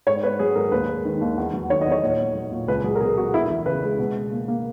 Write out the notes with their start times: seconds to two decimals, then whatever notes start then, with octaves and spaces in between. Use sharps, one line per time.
0.07 G#2 C#5
0.23 B3 B4
0.39 F#3 G#4
0.55 G#2 A#4
0.72 D#2 B4
0.89 G#3
1.05 D#3
1.21 D#2
1.38 E2
1.53 F#3
1.70 D#3 C#5
1.81 D#5
1.87 E2
1.92 C#5
2.03 A#2
2.19 B3
2.35 F#3
2.51 A#2
2.68 C#2 B4
2.84 F#3 G#4
2.95 A#4
3.01 B2 G#4
3.17 B3 F#4
3.34 E2 E4
3.50 E3
3.66 C#3 B4
3.82 G#3
3.99 B2
4.15 B2
4.31 A#3
4.48 A#3